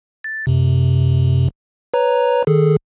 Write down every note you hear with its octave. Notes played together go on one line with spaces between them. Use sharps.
A6
F#2 C3
B4 C#5 A#5
D#3 G#4 A4